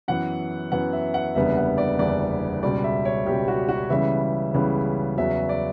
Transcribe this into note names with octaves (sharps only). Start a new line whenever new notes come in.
F#2 E3 B3 F#5
F#2 E3 B3 F#5
E5
F#5
F#1 E2 D3 G3 B3 E5
F#5
D5
F#1 E2 D3 G3 B3 D5
C#2 B2 G3 D5
E5
C#5
C#2 B2 G3 G4
F#4
F#4
C#2 C#3 E3 G3 B3 E5
C#2 C#3 E3 G3 B3
E2 C#3 F#3 B3 E5
D5